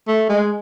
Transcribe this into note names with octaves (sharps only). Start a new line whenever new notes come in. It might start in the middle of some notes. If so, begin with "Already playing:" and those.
A3
G#3